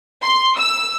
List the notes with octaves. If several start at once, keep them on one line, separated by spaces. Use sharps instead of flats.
C6
E6